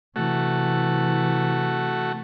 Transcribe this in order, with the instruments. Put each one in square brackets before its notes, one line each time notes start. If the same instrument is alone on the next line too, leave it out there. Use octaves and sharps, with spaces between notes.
[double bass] C3 E3 [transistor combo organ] A3 F#4